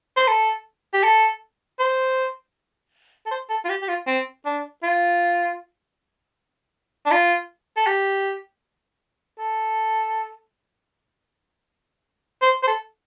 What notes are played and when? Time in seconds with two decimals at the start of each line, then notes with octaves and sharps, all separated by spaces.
0.17 C5
0.28 A4
0.93 G4
1.04 A4
1.79 C5
3.26 A4
3.31 C5
3.50 A4
3.65 F4
3.69 G4
3.82 G4
3.88 F4
4.07 C4
4.46 D4
4.83 F4
7.06 D4
7.11 F4
7.76 A4
7.87 G4
9.39 A4
12.42 C5
12.63 C5
12.67 A4